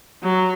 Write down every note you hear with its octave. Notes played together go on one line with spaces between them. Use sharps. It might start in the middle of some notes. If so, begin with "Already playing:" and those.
F#3